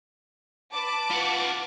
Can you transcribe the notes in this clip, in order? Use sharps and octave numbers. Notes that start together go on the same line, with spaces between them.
B4 A5 D6
F4 F#5